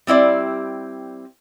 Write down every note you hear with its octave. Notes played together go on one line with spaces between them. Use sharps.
G3 C4 E4 D5